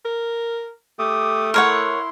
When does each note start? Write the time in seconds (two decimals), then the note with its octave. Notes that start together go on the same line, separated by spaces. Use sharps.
0.05 A#4
0.99 A3 G4 D6 D#6
1.54 E4 A#4 C#5 F#5 C6